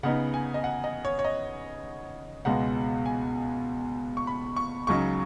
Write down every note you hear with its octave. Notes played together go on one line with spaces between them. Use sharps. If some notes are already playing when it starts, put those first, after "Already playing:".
C#3 B3 D#4 F#5
G#5
D#5
F#5
D#5
C#5
C#5
D#5
C#2 B2 G#3 B3 F#5
G#5
C#6
B5
C#6
C#2 C#3 F#3 D#4 C#6